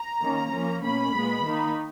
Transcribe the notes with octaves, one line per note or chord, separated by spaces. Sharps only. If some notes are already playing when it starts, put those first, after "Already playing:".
Already playing: A#5
D#3 A#3 C#4
F3 A#3 C#4
B2 A#3 C#4 B5
A#2 G#3 B3
D#3 A#3 D#4